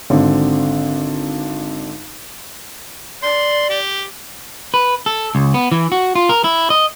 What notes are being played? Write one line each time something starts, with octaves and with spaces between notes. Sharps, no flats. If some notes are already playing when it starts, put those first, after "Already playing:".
G#1 D3 C4
D5 C6
G4
B4
A4
C#2
B3
E3
F#4
F4
A#4
E4
D#5